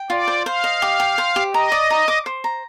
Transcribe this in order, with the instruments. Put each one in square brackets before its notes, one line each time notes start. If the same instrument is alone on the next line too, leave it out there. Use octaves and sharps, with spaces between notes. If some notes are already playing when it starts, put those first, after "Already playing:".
Already playing: [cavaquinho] G5
[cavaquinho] F4 [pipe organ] D5
[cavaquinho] C5
[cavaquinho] C5 [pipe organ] F5
[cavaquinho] D#5
G4
G5
C5
G4
[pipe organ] D#5 [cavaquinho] A#5
[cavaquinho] D5
A#5
D6
C5
A#5